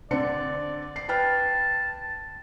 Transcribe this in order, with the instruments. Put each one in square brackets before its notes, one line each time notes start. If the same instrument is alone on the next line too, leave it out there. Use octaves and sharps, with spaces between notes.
[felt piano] D3 C4 C#7 [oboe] D5
[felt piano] C7
[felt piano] B4 G5 F6 [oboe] A5